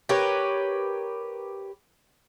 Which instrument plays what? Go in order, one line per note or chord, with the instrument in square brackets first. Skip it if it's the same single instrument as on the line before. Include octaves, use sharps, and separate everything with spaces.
[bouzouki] G4 A#4 B4 C#5